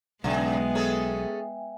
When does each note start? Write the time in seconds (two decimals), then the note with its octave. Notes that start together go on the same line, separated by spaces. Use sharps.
0.24 B1 C#3 G#3 B3 E5 G5 G#5
0.75 C#4 G#4 A4